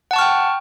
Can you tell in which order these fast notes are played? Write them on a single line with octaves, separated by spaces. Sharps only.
F#5 A5 C#6 F6 G5